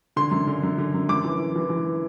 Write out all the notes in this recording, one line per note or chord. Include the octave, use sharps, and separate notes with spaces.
D3 C6
F#2
D3
F#2
D3
F#2
F#2 D6
E3
E3
E3
E3